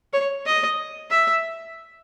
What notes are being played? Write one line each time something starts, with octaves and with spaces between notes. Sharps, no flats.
C#5
D#5
E5